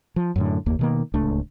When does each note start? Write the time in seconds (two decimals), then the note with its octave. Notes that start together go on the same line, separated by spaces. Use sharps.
0.16 F3
0.36 F#2 A2 D3
0.66 F#1 D#2 A#3
0.79 B2 D#3 A#3
1.14 D1 C#2 A3 D4